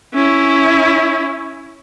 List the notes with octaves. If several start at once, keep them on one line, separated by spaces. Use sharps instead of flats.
C#4 E4